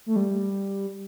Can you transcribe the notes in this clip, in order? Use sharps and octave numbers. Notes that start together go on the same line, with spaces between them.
A3
G3